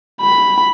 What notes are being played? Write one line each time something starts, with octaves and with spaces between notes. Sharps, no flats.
B5